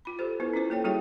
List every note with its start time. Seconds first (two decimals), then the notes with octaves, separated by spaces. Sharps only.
0.05 F4 B5
0.19 G4 A4 C5
0.40 B3 E4 A4 B4 C5
0.53 C#4 E4 F4 C5
0.70 A#3 A4 C#5 G5
0.84 G3 E4 F#4 G#4 C#5 G5